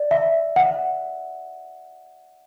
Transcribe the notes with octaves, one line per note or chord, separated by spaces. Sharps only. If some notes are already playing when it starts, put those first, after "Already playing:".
Already playing: D5
E5
F#5